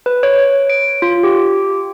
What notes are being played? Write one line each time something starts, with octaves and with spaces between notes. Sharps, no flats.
B4
C#5
D7
F4
G4